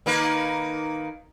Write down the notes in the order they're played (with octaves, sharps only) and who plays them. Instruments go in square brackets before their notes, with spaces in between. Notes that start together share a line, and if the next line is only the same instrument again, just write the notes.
[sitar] D#3 A#3 B4